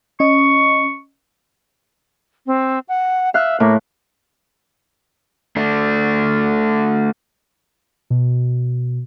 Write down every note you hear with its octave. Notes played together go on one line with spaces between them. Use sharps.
C#4 D#5 C#6
C4
F#5
E5 F5 F#6
A2 A#3
A3 D4
B2